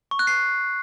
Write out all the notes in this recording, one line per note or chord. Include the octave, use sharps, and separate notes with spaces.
C#6
F#6
C7